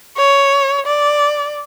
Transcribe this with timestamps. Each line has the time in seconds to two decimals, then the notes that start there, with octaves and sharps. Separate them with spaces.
0.17 C#5
0.86 D5